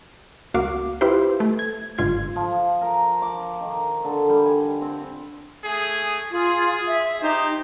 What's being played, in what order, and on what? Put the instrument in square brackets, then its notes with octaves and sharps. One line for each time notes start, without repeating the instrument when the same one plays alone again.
[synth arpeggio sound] C#2 A#3 F#4 F5 D6
E4 F4 G4 B4 C5
A3
G#6
G1 G#2 F4 G#6
[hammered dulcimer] F3
A#4
D6
D#3
D3
G3
G#5
C4
[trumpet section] A3 G#4
[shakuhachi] F4 [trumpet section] G#4
[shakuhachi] E5
[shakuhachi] D#4 [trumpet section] G4 C5